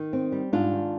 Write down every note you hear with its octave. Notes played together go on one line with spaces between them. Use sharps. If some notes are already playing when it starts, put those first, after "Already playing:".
Already playing: D#3
C4
G3
G#2 D4 F4
D#3